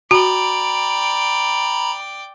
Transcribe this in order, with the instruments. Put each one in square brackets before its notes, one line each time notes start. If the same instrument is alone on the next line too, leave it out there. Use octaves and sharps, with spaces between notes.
[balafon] F#4 [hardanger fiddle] D5 G5 [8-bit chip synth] A#5 B5